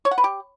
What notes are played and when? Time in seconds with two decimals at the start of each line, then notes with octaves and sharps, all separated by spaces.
0.05 C#5
0.11 F#5
0.18 B4
0.24 G4